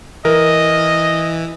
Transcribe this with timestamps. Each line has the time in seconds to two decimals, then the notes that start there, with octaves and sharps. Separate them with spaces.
0.25 E3 A#4 D#5